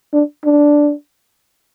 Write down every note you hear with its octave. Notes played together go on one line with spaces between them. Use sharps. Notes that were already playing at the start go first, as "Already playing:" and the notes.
D4
D4